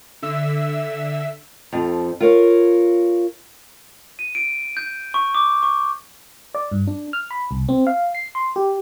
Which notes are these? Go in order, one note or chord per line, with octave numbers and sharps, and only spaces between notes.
D3 E5 E6
F2 F3
F4 A#4 C#5
D#7
D7
G6
C#6
D6
C#6
D5
G2
D4
F6
B5
C2
C4
F5
C7
C6
G4